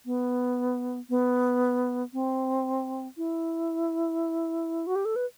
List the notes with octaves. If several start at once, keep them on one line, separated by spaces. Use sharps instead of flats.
B3
B3
C4
E4
F#4
G4
A4
B4